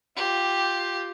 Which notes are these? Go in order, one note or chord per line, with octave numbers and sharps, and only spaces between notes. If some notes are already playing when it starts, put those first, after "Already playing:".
F4 G4